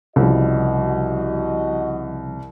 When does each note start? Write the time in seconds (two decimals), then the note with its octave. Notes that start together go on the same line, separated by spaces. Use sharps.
0.16 C2 C#3 F3 G3 F#4 D#5